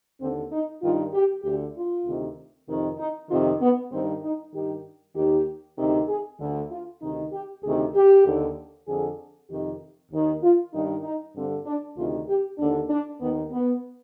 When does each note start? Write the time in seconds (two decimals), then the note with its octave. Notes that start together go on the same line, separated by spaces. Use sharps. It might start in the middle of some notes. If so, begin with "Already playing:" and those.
0.20 D#2 D3 C4
0.51 D#4
0.81 G2 D#3 F4
1.13 G4
1.43 D2 D3 G4
1.75 F4
2.05 D2 C3 D#3
2.67 F2 C3 D#3
2.98 D#4
3.29 F2 C3 D#3 F4
3.60 B3
3.91 G2 D#3 C4
4.22 D#4
4.53 G2 D#3 G4
5.15 D#2 D#3 G4
5.78 D2 C3 D#3
6.08 G#4
6.40 D2 D3
6.70 F4
7.01 D2 C3 D#3 D#4
7.32 G4
7.63 D2 C3 D#3 G#4
7.94 G4
8.25 D#2 D3
8.86 F2 D3 G#4
9.49 F2 C3 D#3 G4
10.10 D#2 D#3
10.42 F4
10.73 G2 D#3 D#4
11.03 D#4
11.34 G2 D3 C4
11.65 D4
11.96 D2 C3 D#3 F4
12.27 G4
12.58 D#2 D3 D4
12.90 D4
13.20 D#2 D#3 B3
13.52 B3